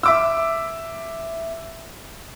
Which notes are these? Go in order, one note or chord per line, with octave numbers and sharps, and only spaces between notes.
E5 D6 E6